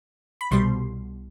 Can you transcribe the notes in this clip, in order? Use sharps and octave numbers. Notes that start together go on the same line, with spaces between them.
B5
C2 B2 G3 C6